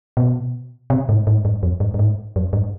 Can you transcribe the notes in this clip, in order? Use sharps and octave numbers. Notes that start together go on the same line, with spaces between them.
B2
C3
G#2
G#2
G2
F2
G2
G2
G#2
F#2
G2